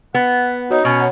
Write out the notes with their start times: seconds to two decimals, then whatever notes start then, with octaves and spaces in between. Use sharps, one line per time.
0.15 B3 F#5
0.70 D#4 F#4 C#5 D#5
0.85 B2 C#4
0.98 C#5 F#5 A#5